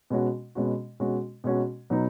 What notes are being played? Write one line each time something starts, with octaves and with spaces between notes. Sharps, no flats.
B2 G#3 C#4 F#4
B2 G#3 C#4 F#4
B2 G#3 C#4 F#4
B2 G#3 C#4 F#4
B2 F#3 B3 D#4